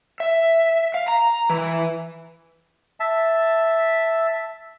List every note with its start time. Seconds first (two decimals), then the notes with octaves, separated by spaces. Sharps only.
0.20 E5
0.94 F5
1.08 A#5
1.50 E3
3.00 E5 A5